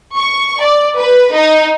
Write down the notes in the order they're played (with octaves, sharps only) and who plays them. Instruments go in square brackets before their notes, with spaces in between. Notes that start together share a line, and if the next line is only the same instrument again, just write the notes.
[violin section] C#6
D5
B4
D#4